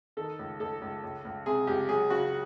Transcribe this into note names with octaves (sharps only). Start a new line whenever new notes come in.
D#3 A4
C#2
C#2 A4
C#2
C#2
C#2
C3 G#4
C#2 G4
F#3 G#4
C#3 F#4